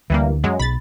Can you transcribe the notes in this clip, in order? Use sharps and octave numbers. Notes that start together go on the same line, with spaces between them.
D2 E3 G3 A#3
F#2 F#3 G#3
B1 B5 A6